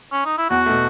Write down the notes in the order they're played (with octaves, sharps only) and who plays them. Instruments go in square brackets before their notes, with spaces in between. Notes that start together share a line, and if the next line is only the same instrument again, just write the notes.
[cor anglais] C#4
D#4
E4
[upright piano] E2 [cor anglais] F#4
[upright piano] B2 A3